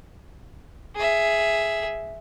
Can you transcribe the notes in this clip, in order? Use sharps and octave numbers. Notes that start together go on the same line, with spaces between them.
G#4 E5